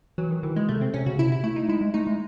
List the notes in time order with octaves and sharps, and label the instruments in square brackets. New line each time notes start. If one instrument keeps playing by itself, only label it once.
[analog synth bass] E3 [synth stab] F#3
[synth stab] D#3
[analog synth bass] D#3 [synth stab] E3
[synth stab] G#3
[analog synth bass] C3 [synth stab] A3
[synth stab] C4
[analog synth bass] C3 [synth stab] C#4
[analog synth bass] C#3 [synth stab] F#4
[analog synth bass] C3 [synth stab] E4
[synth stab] E4
[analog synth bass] A3 [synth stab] E4
[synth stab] D#4
[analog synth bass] G#3 [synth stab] E4
[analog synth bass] G#3
[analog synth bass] A3 [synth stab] D#4
[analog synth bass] G#3